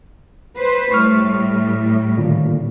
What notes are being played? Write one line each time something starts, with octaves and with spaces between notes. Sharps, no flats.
B4 C5
A2 G3 C#6 F6
A#2 D3 D#3